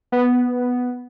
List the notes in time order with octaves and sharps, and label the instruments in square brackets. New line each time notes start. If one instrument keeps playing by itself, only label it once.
[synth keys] B3